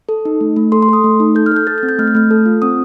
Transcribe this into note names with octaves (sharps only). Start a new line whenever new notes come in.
A4
D#4
A3
A3
A4 C6
C6
A4 D#6
A3
D#4
A4 G6
F6
A4 G6
A4 A6
G6
C4
G6
A3 F6
G6
A3 F6
A4
F4
C4 D#6